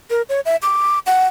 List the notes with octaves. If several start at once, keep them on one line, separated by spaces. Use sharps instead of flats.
A#4
C#5
E5
D6
F#5